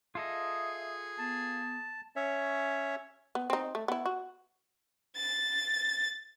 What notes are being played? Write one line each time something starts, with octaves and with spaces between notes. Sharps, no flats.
F4 G#4 A4 D#5 E5
B3 A5
C#4 C#5 E5
B3
C4 D#4
A3
B3 E4
F#4
A6